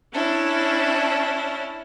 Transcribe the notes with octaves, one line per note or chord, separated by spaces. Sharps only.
C#4 D4 E4